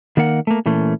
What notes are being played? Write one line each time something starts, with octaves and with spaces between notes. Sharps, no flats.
D#3 A#3 A#4 F#5
A3 A#3
A#2 E3 A3 C#4